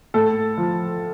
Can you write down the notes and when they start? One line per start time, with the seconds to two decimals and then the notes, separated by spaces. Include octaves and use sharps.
0.14 A2 A4
0.57 F3